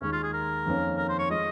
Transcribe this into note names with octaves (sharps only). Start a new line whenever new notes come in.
D#2 D#3 G#3 C#4 D#4
F4
G#4
A#4
F2 D#3 A#3 C#4
A#4
C5
C#5
F3 G#3 D#5